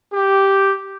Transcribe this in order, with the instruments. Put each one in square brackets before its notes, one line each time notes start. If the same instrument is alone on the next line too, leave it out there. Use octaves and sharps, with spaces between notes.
[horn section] G4